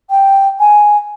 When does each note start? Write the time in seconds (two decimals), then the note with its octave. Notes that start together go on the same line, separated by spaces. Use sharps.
0.10 G5
0.59 G#5